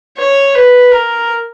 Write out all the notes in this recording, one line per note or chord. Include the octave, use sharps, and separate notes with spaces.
C#5
B4
A#4